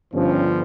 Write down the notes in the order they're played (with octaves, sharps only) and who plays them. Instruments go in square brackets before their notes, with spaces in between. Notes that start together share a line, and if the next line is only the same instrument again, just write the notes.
[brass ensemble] G1 G2 F3 C#4